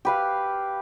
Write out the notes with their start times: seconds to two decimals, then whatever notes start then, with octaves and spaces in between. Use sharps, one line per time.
0.05 G4 B4 F5